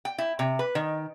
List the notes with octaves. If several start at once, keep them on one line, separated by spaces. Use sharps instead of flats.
G5
E4
C3
B4
D#3